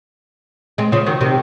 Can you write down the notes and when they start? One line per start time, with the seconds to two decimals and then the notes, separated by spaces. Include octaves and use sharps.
0.78 G#3 C4
0.92 C#3 F3
1.06 D#3 F#3
1.21 C3 D#3